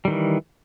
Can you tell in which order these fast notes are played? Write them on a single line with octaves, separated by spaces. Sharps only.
G3 D#3 E3